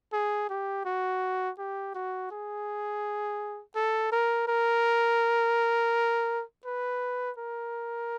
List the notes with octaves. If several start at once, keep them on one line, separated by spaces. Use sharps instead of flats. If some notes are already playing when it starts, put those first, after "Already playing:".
G#4
G4
F#4
G4
F#4
G#4
A4
A#4
A#4
B4
A#4